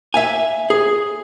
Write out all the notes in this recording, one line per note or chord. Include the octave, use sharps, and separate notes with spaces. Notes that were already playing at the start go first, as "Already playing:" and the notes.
E5 F5 G#5
G#4